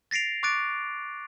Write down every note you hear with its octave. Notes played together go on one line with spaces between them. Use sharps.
A6 A#6 C7 D7 F7
C#6 D6 F#6 A6 D7